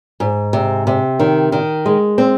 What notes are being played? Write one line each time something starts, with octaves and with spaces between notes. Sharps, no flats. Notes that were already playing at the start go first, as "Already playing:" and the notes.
G#2
C3
C3
D#3
D#3
G#3
C4